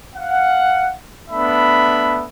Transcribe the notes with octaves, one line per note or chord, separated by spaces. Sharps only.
F5 F#5
A3 B3 D4 E5 B5